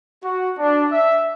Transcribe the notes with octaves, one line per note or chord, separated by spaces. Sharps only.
F#4
D4
E5